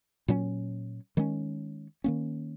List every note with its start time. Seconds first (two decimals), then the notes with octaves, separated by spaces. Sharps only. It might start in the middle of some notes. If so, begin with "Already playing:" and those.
0.28 A#2 F#3 C#4
1.17 D#3 G#3 C#4
2.04 D#3 A#3 C#4